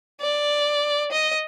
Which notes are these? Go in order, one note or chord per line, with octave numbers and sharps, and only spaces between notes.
D5
D#5